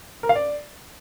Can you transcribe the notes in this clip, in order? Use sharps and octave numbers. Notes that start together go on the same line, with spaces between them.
A#4
F5
D5